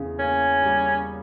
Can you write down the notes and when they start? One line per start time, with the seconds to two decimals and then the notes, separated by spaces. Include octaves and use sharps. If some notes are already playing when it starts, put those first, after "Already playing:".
Already playing: E2 C#3
0.19 A#3 C#4
0.62 G3